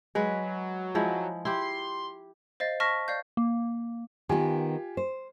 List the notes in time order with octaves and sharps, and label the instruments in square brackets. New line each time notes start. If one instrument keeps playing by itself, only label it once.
[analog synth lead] F#3 [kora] G#3 B4
[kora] F3 G#3 E4
[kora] E4 G4 [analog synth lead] C6
[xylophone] C5 D#5 F5 A6
A5 C#6 F6 A#6 B6
D5 F5 G6
[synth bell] A#3
[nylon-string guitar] D#3 B3 [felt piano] F4 G4 G#5
[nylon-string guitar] C5